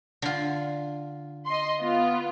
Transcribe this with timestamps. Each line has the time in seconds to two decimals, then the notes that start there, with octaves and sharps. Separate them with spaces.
0.22 D3 F4
1.46 D#5 C6
1.81 B3 F4